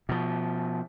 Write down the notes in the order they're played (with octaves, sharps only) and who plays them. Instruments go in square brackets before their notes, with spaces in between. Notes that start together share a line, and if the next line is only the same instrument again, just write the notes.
[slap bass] B2 F3